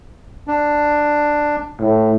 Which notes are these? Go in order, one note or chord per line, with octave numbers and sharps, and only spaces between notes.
D4
A2